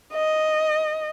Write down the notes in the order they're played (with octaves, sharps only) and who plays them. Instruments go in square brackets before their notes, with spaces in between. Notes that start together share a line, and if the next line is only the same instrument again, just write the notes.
[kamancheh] D#5